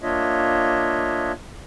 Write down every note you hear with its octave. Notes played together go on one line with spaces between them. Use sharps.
A#3 D4 F4 C#5 D#5 E5